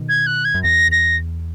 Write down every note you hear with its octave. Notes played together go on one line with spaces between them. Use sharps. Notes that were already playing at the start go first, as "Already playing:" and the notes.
Already playing: B2 D#3
G#6
F#6
G#6
F#2
E2 A#6
A#6